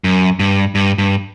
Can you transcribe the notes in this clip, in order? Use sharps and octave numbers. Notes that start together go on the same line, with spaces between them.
F#2
G2
G2
G2